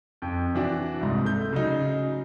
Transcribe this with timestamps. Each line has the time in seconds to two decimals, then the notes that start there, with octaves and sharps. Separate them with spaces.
0.22 F2
0.55 E3 D4 F#4
1.01 C2 G#2
1.25 A3 G6
1.53 C#3 F#3 D#4